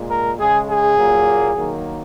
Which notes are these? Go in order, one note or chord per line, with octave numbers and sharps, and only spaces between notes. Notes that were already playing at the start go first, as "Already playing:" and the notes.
Already playing: A#2 G#3
A#4
C#3 G#3 G#4
G#4
A#2 F#3 A#3
D#3 F#3 A#3